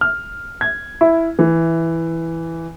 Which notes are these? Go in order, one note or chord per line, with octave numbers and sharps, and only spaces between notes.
F6
G#6
E4
E3